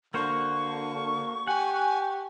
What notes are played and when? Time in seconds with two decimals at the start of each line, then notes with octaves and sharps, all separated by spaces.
0.14 D3 A#3 F#4 C5 C#6
1.47 G4 F#5 G#5